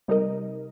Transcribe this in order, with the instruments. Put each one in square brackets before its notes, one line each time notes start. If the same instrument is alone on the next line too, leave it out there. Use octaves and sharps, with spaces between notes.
[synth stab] C3 G3 D#4 A#4 D#5